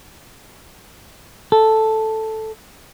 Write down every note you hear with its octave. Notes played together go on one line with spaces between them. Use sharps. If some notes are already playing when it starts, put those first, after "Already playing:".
A4